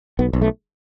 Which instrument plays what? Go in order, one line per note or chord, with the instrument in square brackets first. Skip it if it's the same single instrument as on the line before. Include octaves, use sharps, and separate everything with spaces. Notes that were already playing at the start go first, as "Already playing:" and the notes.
[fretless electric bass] B1 B3
B1
A3